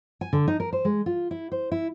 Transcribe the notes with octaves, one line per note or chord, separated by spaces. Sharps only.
G#5
D3
D#4
A#4
C5
G#3
F4
E4
C5
E4